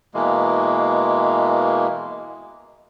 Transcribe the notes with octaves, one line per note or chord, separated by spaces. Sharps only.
B2 E3 G#3 A#3